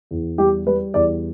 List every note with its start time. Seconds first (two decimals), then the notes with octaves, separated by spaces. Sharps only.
0.11 E2
0.38 G3 G4
0.67 G3 B4
0.94 E2 D5